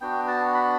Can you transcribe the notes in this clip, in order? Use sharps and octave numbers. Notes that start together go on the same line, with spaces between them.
B3 D4 F#4 G5
A5
B5